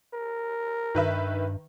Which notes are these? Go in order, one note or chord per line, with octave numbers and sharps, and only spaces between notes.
A#4
G2 D#3 B4 E5